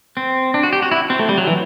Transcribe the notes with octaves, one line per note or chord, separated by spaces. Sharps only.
C4
D4
F#4
G4
F#4
E4
C4
A3
G3
F#3
E3